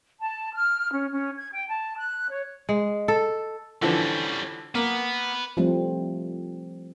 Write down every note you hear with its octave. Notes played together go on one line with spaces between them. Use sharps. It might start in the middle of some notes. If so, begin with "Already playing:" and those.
A5
F6
C#4
C#4
G#6
G5
A5
F#6
C#5
G#3
A4
D3 E3 F3 G3 C#4
A#3 B3
F3 G3 A3 C4